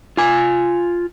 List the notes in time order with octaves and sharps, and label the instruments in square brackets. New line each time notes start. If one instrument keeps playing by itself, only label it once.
[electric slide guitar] F4 G#5